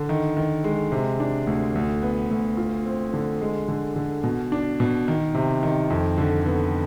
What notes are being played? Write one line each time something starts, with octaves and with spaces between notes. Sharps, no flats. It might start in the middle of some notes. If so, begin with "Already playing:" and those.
Already playing: D3
D#3
D#3
G#3
C3
D4
D2
D2
B3
D2
F4
C4
D3
G#3
D3
D3
B2
D4
B2
D#3
C3
D#3
F2
D3
B3